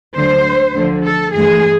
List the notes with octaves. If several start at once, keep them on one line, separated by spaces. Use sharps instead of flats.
D2 D3 F#3 C5
D2 D3 F3
A4
G2 E3 A3 G#4